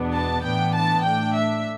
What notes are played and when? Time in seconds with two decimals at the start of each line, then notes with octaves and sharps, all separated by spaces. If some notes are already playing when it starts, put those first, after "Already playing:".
Already playing: E2 B2 B3 D4
0.14 A5
0.44 A2 E3 B3 D4 G5
0.76 A5
1.05 A2 A3 D4 G5
1.37 E5